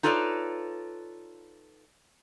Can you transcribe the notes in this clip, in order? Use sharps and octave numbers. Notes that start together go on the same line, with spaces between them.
D#4 F4 A4 B4 C#5 D5